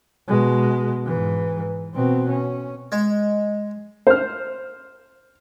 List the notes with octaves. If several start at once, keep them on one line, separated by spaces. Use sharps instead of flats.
B2 G#3
G#2 E3
B2 C4
C#4
G#3
C5 F6